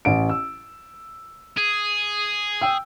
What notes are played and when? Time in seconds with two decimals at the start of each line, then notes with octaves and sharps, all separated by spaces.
0.05 A1 D7
0.29 E6
1.57 G#4
2.62 G5 E6